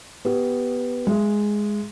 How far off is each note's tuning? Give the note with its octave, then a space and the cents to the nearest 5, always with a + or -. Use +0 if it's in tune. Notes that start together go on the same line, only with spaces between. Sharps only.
B3 +0 G4 +0
G#3 +0 E5 +20